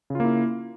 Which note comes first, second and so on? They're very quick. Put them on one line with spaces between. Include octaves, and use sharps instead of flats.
C#3 F4 A#3 E4